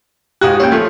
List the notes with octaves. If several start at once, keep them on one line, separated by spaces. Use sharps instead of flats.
G#2 F#4 G4 F5 D#6 F#6
A#1 C#4 C#5 G5
F3 A3